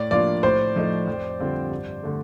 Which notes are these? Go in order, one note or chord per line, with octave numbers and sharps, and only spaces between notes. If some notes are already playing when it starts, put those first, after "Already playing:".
Already playing: A2 D5
F3 A#3 D4 F4 D5
A2 C5
F3 A3 D#4
F2
D3 G3 C4 F4
G2
D3 A3